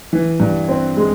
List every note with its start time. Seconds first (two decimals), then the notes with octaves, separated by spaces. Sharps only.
0.13 E3
0.40 G2
0.69 C4
0.97 G#3